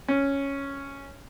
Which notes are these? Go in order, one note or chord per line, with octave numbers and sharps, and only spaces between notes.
C#4